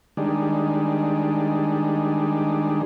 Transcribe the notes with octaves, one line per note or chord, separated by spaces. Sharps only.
D#3 G3 G#3 D4